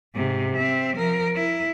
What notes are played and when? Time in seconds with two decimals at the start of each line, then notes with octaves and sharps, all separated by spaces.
0.15 G#2 C3
0.56 C4 E5
0.96 F3 A#4
1.35 E4